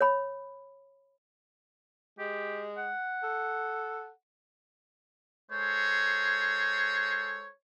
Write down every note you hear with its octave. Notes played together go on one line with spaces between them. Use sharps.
C#5 B5
G#3 G4
F#5
A4
G#3 A4 C5 C#5